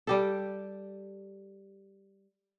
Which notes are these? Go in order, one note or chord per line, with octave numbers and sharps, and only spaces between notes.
G3 G4 A4